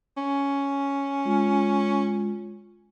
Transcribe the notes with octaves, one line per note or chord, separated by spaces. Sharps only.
C#4
G#3 F4